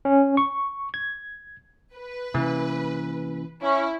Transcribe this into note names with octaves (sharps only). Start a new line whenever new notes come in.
C#4
C#6
G#6
B4
C3 E3 A#3 C#4
C#4 E4